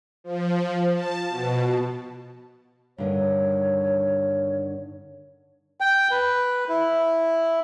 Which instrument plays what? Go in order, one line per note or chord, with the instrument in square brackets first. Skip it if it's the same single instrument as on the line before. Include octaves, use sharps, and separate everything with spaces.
[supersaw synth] F3
A5
B2
[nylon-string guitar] G2 D3 D#3 [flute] C#5
[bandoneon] G5
B4
E4